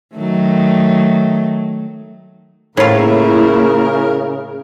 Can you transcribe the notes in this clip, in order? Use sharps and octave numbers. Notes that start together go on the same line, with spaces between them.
D#3 F#3 A3
A2 C#3 A#3 E4 F4 A#4